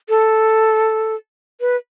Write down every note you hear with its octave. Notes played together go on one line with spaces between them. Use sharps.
A4
B4